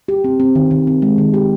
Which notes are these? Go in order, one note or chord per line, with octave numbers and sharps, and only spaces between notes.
G4
C4
C4
D#3
D#3
C4
G#3
D#3
G4